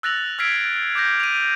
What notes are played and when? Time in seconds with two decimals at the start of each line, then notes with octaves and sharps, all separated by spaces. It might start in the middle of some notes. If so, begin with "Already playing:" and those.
0.03 E6 F#6 A6 A#6 F7 F#7
0.39 E6 F6 G#6 B6 C7 D7
0.95 D6 G6 A#6
1.20 D#7 F7